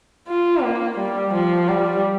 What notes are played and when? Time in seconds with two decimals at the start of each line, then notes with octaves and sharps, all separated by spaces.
0.28 F4
0.63 A#3
0.98 G3
1.34 F3
1.68 G3